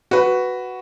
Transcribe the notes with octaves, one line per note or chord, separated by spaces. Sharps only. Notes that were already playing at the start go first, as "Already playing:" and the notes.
F#4 B4